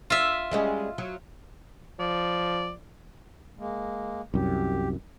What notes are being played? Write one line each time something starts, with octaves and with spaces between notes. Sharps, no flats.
F4 E5
G3 G#3 C#4
F#3
F3 D5
G#3 A#3
C2 F#2 G4